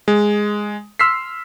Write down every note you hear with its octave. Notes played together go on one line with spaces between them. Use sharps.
G#3
C6 E6 F6 B6 C7